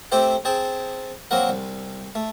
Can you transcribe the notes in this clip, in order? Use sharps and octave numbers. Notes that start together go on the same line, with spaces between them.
A3 C4 G4 A4 C5 G5
C4 G#4 G5 A5
F#3 A#3 C4 F#4 A#4 F#5
C2
A3